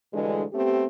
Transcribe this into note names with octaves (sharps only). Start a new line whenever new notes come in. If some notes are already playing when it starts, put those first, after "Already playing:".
D2 G2 D3 E3 G#3
A3 B3 C4 G4